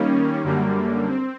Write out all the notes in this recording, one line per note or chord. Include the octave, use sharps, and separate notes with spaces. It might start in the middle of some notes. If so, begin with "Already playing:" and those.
Already playing: D#3 G3 A#3 C#4
F#2 D3 G3 A#3
C4